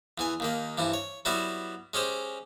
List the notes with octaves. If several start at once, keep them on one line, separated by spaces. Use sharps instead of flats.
E2 E3 G#5
D#2 D#3 A#3
G2 C3 E3 E4
C#5
F#3 G3 B3 E4 F#4 E5
G#3 C#4 G4 C5